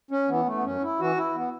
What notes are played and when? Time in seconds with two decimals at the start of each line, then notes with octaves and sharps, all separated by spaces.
0.11 C#4
0.29 E3 B3
0.46 A3
0.56 B3
0.64 F#2 C#4
0.82 E4
0.99 E3 F#4
1.17 E4
1.35 B3